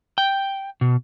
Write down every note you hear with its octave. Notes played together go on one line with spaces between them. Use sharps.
G5
B2